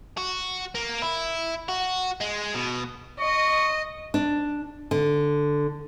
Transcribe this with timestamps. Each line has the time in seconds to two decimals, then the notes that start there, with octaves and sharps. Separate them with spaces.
0.17 F#4
0.75 A#3
1.02 E4
1.69 F#4
2.21 G#3
2.55 B2
3.20 D#5 C#6
4.14 D4
4.91 D3